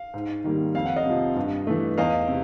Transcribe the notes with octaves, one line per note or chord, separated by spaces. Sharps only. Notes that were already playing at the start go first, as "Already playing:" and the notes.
Already playing: F5
G#2
D#3 G3 A#3
F2 F5
F#5
D#5 F5
C3 F3
G2
E3 A3
E2 D#5 F5
C3